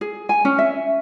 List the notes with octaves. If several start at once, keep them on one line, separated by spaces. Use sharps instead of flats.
G#4
G#5
C#4
E5